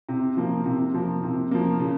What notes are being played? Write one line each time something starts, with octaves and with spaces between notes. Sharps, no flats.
C3
F3 A#3
C3
F3 A#3
C3
F3 A#3
C#3